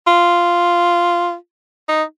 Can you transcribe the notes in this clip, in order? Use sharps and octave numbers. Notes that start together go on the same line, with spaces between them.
F4
D#4